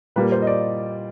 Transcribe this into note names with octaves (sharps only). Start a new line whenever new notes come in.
A#2 G3 A#3 B4
C5
D#5
D5